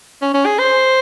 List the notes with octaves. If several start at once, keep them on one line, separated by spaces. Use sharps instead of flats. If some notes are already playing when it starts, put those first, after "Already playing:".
C#4
C#4
G#4
C5